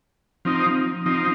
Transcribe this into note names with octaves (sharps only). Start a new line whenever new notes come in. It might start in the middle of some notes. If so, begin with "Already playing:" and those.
F3 C4 D#4
F3 C4 D#4